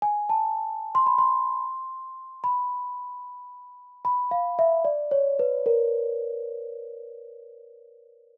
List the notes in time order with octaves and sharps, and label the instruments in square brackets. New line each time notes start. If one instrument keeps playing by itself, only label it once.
[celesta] G#5
A5
C6
B5
C6
B5
B5
F5
E5
D5
C#5
B4
A#4